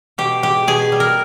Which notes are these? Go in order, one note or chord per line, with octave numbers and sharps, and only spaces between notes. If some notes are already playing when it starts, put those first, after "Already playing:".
B2 G4
G#3 G4
B2 G#4
G3
A#4